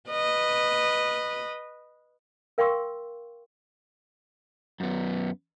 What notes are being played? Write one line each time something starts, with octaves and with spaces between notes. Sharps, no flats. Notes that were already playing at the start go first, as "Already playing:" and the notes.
B4 D#5
A#4 F5 G5 C6 C#6 E6
F#2 B3